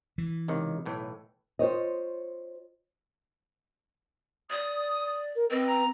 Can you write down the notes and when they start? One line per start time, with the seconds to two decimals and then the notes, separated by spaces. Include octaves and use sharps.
0.18 E3
0.48 C#2 C3 D#3
0.86 B1 A2 E3
1.59 F4 C5 C#5 D#5
4.50 D5 D#6
5.36 A#4
5.51 C4 B4 D#5
5.67 A#5